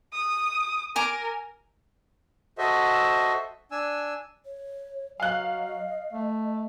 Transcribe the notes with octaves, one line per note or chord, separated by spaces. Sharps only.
D#6
A#4 G#5 A#5 D6
F#4 A4 C5 D#5 E5
D4 G#5 E6
C#5
F#3 D#5 F5 F#6
A3